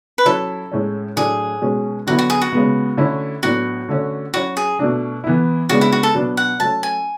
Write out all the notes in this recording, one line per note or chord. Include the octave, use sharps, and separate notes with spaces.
B4
F#3 C#4 E4 A4
A2 G#3 C#4
A2 F#3 A3 D4 G#4
B2 G#3 C#4
D3 F#3 B3 E4 F#4
F#4
G#4
F#4
C#3 G#3 B3
D3 A3 C#4 E4
A2 F#3 B3 D4 F#4
D3 A3 C#4
F#3 C#4 E4 F#4
G#4
B2 A3 D4
E3 B3 E4
C#3 G#3 B3 D4 F#4
E4
F#4
A4
B2 F#3 B3 D4
F#5
F#3 A3 C#4 A5
G#5